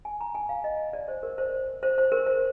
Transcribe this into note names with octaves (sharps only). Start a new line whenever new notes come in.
G#5
A#5
G#5
F5
D#5
D5
C5
A#4
C5
C5
C5
A#4
C5